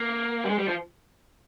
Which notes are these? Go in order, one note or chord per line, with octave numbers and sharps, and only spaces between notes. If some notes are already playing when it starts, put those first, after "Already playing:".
Already playing: A#3
G3
G#3
G3
F3